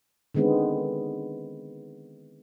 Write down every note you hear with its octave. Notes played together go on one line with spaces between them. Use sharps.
D3 D#3 G#3 B3 C4